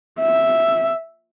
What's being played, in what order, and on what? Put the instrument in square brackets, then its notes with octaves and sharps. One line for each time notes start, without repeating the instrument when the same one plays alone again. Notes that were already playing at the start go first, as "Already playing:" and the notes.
[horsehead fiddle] E5